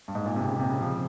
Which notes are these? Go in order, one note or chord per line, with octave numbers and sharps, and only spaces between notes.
G2
G#2
A#2
C3
C#3
C3
C#3
F3